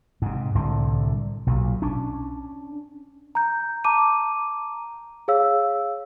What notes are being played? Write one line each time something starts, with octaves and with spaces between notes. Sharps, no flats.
G#2 C3
C2 A2 D3
B1 A#2
C#4 D4
A#5 G6
A5 A#5 D6 D#7
G#4 C#5 F5 E6